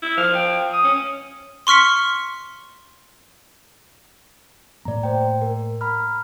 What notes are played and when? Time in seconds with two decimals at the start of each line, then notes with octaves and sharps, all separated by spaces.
0.03 E4
0.17 F3 F6
0.35 G5
0.72 D#6
0.84 C#4
1.67 C6 C#6 F6 B6 C#7
4.85 A2 A3 A#3 D5 A#5
5.03 C5 G5
5.42 A#4
5.81 A#5 B5 F6